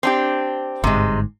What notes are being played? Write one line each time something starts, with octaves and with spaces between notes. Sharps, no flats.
C4 D4 G4
G1 G#2 C3 G#3